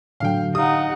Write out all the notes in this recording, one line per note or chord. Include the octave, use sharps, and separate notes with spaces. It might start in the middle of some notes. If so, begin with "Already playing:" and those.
A2 D3 F#3 F5 G5
D#4 G4 F5 F#5 D#6